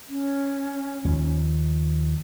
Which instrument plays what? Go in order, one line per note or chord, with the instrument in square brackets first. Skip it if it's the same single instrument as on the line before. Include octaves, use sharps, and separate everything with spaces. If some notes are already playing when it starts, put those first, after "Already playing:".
[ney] C#4
[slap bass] D#2 F3